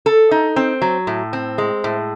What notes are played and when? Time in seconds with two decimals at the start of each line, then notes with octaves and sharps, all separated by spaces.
0.06 A4
0.31 D#4
0.56 C4
0.82 F#3
1.07 A2
1.33 C4
1.58 G#3
1.84 A2